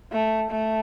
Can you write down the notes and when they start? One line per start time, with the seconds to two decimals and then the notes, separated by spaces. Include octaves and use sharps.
0.13 A3
0.52 A3